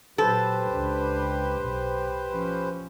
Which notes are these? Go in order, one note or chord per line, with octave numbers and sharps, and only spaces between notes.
A#2 F#3 G4 A4 B4 C5
C#2 D4
B1
F3 C#4